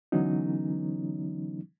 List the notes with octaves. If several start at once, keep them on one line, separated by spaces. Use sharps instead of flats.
D3 E3 F#3 B3 C#4 D#4